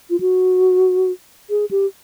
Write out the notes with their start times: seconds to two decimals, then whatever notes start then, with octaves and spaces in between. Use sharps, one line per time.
0.10 F4
0.20 F#4
1.50 G#4
1.71 G4